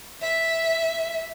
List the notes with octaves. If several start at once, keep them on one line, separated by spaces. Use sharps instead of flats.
E5